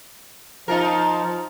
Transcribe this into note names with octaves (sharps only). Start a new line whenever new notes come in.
F3 D#4 F4 A#4